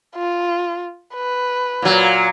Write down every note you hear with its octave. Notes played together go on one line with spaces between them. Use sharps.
F4
B4
A#2 F#3